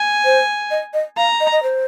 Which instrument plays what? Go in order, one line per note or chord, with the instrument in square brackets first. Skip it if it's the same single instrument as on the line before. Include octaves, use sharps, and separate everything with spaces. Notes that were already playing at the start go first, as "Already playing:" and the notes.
Already playing: [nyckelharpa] G#5
[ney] C5
D#5
D#5
[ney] F5 [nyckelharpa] A#5
[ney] D#5
D#5
C5